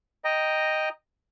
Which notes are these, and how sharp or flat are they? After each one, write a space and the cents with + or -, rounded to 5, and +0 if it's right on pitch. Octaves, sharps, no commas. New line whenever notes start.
D#5 +0 G5 +0 A#5 +0